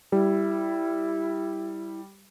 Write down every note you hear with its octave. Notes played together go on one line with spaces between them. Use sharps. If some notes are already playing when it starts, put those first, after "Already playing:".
G3 E4